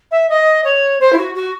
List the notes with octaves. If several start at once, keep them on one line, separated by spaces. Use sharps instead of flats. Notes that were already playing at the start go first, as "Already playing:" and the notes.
E5
D#5
C#5
C5
E4
F#4
F#4